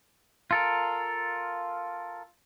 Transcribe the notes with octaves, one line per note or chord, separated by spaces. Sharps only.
F4 A4 A#4